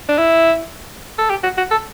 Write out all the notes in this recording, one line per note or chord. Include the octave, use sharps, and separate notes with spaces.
D4
E4
A4
G4
F#4
F#4
A4